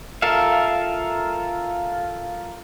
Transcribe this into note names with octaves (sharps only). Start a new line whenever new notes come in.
F4 A4 A#4 E5 F5